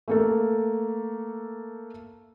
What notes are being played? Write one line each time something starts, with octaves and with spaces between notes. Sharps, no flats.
A3 A#3 A4